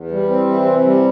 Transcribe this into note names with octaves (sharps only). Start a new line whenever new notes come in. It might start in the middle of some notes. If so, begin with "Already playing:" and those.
Already playing: E2
G3
C4
E3
C3
G3